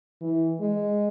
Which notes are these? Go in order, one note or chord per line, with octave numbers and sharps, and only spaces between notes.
E3
G#3